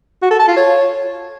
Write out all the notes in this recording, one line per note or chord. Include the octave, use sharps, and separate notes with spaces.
F#4
A4
A5
F4
C#5